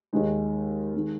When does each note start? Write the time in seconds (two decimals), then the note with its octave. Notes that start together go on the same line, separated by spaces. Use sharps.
0.13 D#2 D#3 G#3 D#4
0.94 D#3 G#3